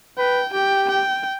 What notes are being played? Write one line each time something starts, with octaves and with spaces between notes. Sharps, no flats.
B4 G5
G4 G5
G5